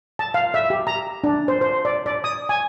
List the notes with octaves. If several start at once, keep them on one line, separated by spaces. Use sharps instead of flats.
A5
F5
E5
G4
A#5
D4
C5
C5
D5
D5
D#6
G#5